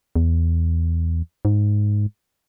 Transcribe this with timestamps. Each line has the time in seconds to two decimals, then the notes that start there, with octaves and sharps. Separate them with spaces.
0.16 E2
1.45 G#2